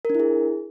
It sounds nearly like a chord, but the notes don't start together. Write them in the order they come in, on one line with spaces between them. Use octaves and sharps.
A#4 D4 E4 G#4